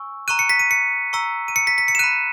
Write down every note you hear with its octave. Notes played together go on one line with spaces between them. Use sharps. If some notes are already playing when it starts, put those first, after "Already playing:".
Already playing: G#5 C#6 E6
A#5 C#6 F#6 D#7
C#7
B6
D#7
C#7
A#5 C#6 E6
D#7
C#7
B6
B6
C#7
E7
B5 F#6 D#7